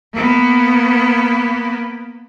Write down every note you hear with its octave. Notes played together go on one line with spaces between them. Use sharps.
A#3 B3